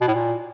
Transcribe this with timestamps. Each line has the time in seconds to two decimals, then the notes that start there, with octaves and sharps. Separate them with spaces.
0.01 B2
0.08 A2
0.14 A#2